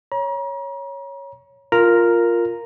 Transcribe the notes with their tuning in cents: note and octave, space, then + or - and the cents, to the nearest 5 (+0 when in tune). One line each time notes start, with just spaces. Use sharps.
C#5 +0 A#5 +40
F4 +0 A#4 +0 A#5 +0